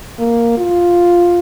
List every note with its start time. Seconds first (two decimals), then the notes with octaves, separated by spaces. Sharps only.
0.19 A#3
0.57 F4